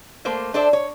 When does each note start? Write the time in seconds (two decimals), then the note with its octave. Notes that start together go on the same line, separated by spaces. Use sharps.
0.25 A3 A#3 C5
0.54 D4 A4 C5 D5 E5
0.73 C#5